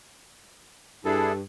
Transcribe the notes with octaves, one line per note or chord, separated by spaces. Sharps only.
G2 D4 E4 G#4 A4